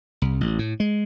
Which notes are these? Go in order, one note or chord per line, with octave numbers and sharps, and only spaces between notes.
C2
A1
A2
G#3